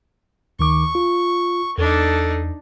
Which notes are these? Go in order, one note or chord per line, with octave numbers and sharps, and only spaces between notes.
D2 D#3 C#6 D6
F4
E2 D4 D#4 A4